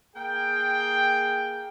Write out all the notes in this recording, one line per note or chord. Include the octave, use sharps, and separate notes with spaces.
A#3 G#4 G5